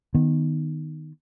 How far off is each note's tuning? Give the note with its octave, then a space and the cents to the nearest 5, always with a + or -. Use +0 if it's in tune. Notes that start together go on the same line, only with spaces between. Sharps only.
D#3 -10 B3 -5